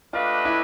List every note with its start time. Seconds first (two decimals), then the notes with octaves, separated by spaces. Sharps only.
0.13 A3 D4 F4 G4 B4 D#5
0.45 E4